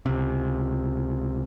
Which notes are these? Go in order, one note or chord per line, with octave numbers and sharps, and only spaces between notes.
C#2 C3